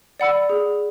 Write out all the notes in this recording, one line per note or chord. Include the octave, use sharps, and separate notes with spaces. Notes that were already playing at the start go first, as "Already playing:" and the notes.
D5 F#5 B5 E6
G#4